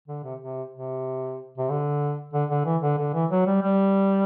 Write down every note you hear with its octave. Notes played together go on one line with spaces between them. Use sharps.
D3
C3
C3
C3
C3
D3
D3
D3
E3
D3
D3
E3
F#3
G3
G3